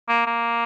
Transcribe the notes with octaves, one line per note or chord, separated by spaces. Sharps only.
A#3
A#3